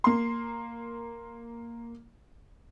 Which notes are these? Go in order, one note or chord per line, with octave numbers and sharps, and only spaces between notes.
A#3 C6